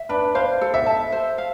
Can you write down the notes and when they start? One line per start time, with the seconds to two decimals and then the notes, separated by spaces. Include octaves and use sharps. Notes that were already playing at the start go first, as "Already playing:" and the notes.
Already playing: E5
0.09 D4 B4
0.35 C5 F5
0.61 A4
0.74 E5
0.86 A5
1.12 C5
1.38 F5